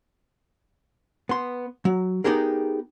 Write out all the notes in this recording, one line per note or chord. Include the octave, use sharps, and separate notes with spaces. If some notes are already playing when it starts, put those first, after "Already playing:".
B3 C6
F#3
B3 D#4 G4 G#4 A#4